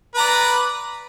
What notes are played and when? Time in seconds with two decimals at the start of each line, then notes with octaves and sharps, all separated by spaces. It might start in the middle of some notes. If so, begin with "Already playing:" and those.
0.15 B4
0.17 A#5
0.20 D5